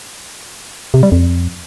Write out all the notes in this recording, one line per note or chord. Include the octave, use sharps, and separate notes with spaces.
C3
G3
F2